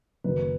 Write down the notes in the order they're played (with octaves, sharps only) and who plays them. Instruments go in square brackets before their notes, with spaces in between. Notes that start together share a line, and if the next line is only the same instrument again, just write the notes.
[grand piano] F#1 F#2 D#3 B4